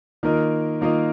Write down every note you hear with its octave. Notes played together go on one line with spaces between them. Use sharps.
D#3 A#3 F4 A#4 D#5
D#3 A#3 F4 A#4 D#5